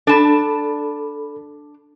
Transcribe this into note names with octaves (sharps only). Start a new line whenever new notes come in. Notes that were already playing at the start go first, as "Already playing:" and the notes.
D4 A4 A5 B5